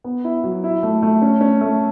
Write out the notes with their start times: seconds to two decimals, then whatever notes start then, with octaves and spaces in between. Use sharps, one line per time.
0.04 B3
0.24 E4
0.44 F#3
0.64 E4
0.83 A3
1.02 A3
1.22 C#4
1.41 C#4
1.61 A3